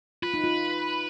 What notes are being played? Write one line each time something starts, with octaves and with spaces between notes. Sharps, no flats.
F4 B4
D#4
F4